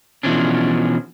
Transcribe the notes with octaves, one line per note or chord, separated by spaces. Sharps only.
B2 E3 F3 C#4 D4